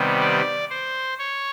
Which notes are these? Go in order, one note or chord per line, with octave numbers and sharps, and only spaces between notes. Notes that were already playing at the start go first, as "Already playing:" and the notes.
Already playing: C3 D#3 G3 B3
D5
C5
C#5